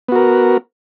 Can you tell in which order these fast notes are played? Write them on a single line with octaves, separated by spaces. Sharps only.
B3 F#4 A#4